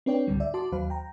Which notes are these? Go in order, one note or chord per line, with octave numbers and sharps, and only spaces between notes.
C4 D4 B4 C#5 D5 G5
C#2 G#2 D3 G3
D5 E5
F#4 A5 C6 D6
D#2 F#3 C5 F5 B5
G5 A#5